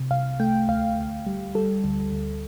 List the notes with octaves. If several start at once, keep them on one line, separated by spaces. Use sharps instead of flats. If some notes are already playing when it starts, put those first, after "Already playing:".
Already playing: C3
C2 F5
A3 G5
D2 F5
D2
G3
G3 A4
D2
D2